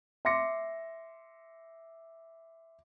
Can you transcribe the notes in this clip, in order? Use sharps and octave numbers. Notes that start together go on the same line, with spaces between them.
E5 C6 D6 A#6 C#7